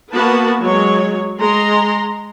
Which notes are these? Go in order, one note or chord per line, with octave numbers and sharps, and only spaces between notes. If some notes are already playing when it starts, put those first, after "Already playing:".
A#3 B3 F#4 B4 A5
F#3 G#3 C#5
G#3 A#5 C6